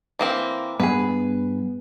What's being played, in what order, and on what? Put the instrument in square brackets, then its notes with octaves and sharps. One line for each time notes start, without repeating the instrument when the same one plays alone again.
[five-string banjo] E3 A#3 C4
[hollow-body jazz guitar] G2 G#4 [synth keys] B3 [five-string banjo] B4